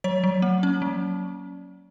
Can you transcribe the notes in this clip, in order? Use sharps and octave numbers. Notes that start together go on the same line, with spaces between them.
F#3 C#5
F#3
A#3
C#4
F#3